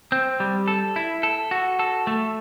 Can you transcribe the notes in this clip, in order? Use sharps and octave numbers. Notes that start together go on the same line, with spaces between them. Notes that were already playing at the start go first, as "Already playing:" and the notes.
C4
G3
A4
E4
A4
F#4
A4
A3